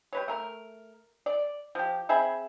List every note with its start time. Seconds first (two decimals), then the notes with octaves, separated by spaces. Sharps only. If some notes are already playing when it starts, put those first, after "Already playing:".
0.13 G3 B4 C#5
0.28 A3 A#4
1.26 D5
1.75 F3 G4
2.09 C4 G#4 E5 B5